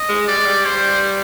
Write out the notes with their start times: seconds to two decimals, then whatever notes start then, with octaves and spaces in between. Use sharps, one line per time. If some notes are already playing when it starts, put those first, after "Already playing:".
Already playing: D#5
0.09 G#3
0.28 G3 D5
0.37 G#3
0.46 G3
0.66 C5